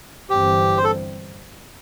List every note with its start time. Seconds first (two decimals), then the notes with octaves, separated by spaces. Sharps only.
0.30 G1 G2 E3 C4 G4
0.77 C5
0.84 A4